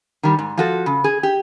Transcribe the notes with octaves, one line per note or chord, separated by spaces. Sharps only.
D#3 G3
G#2
F3 F#4 A4
C#3
G#4
G4